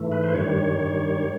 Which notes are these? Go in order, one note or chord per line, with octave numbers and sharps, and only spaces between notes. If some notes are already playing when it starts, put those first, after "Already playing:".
Already playing: G#2 E3 A3
B4
C5
G2 D#3 G3 C#5
G2 D#3 G3